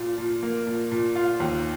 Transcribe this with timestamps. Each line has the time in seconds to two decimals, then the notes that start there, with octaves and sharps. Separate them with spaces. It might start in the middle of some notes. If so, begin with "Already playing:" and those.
Already playing: A#2 F4
0.18 A#2
0.43 A#3
0.67 A#2
0.92 A#2
1.16 F4
1.40 D#2